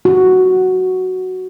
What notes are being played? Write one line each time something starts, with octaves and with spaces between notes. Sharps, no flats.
F#4